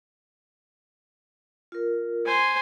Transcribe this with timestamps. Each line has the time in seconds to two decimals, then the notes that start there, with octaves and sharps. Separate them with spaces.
1.72 F4 A#4
2.26 C5 G#5